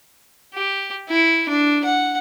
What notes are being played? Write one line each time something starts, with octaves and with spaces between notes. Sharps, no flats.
G4
E4
D4
F#5